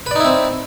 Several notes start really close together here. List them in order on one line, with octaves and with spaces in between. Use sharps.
B4 D5 D#4 E4 C4